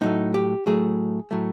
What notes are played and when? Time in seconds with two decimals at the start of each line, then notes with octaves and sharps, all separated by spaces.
0.01 A2 F#3 A3 D#4
0.34 G4
0.66 A2 F#3 A3 G#4
1.31 A2 F#3 A3